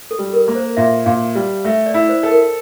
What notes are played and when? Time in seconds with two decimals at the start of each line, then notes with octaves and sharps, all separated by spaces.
0.11 A4
0.19 G3
0.33 A#4
0.48 A#3
0.55 C5
0.77 A#2 E5
1.06 A#2 F5
1.35 G3
1.65 A3 E5
1.86 D5
1.94 E4
2.09 C5
2.23 A4
2.31 A#4